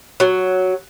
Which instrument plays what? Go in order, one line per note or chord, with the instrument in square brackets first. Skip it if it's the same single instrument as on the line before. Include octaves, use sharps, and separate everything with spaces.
[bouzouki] F#3